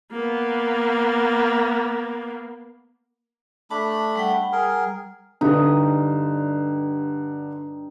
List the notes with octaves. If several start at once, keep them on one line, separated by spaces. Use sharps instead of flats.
A#3 B3
A3 D4 A5 B5 D6
G3 F#5 G5
G#4 A#4
G2 D3 D#4